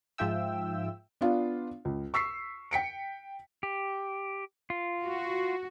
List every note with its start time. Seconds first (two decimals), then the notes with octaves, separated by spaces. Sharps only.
0.18 G#2 F3 F4 E5 G5 E6
1.21 B3 D4 F4 F5
1.85 C#2
2.14 C#6 E6 B6 C7
2.71 G5 B6 C#7 D7
3.63 G4
4.70 F4
5.03 F#4